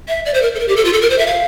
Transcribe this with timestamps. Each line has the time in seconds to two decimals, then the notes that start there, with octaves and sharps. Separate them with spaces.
0.08 E5
0.25 D5
0.34 C5
0.42 A#4
0.55 A4
0.59 A#4
0.68 G4
0.77 A4
0.85 F4
0.93 A4
1.02 A#4
1.10 C5
1.19 E5
1.27 F5